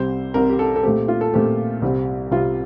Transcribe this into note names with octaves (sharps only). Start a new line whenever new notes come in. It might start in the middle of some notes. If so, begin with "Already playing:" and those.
Already playing: C2 C3 G3 C4 C5
C2 C3 G3 C4 A#4
G4
A4
A4
A#2 A3 C4 G4
F4
A4
A#2 A3 C4 G4
C2 C3 G3 C4
C2 C3 G3 C4 F4